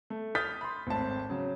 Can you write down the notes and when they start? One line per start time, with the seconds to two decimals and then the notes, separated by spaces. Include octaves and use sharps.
0.10 A3
0.35 D#6 F6 G6 A6 B6
0.61 B5 C6
0.87 G#1 A2 C4 A5
1.30 C#3 F#3